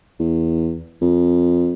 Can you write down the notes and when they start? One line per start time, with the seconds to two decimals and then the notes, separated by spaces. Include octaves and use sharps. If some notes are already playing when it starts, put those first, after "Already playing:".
0.19 E2
1.01 F2